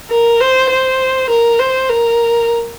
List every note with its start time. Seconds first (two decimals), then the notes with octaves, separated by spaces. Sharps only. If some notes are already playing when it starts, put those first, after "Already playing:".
0.11 A#4
0.40 C5
0.70 C5
1.30 A#4
1.59 C5
1.89 A#4